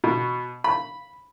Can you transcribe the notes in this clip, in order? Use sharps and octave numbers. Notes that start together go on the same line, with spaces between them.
B2
B5